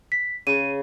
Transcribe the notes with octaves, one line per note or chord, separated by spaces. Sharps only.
B6
C#3 D#7